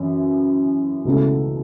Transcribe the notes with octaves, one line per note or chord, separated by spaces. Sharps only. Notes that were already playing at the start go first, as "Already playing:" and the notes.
Already playing: F#2 E3
C#2 B2 A3 E4 A4